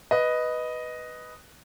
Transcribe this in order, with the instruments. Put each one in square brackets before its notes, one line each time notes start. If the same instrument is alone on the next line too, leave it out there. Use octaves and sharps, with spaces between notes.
[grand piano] B4 D#5